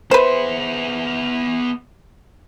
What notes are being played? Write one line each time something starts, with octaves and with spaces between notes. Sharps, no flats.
B3 B4 C5 E5